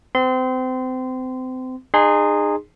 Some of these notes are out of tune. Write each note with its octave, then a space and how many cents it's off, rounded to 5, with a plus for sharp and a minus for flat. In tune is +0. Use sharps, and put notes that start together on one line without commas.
C4 -30 C6 -25
D#4 -35 G#4 -15 C6 +0